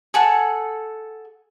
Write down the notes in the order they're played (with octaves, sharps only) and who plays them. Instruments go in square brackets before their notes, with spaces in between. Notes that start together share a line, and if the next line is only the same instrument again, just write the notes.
[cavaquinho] G#4 A4 F#5